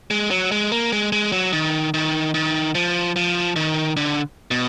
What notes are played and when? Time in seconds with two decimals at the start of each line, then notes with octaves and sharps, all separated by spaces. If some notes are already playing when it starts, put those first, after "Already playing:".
0.11 G#3
0.31 F#3
0.52 G#3
0.72 A#3
0.93 G#3
1.12 G#3
1.32 F#3
1.53 D#3
1.94 D#3
2.34 D#3
2.75 F3
3.16 F3
3.56 D#3
3.97 D3
4.51 B2